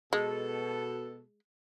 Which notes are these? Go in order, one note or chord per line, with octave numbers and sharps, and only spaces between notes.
B2 G#3 A4